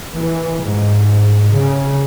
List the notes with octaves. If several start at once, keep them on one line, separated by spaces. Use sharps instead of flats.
E3
G#2
C#3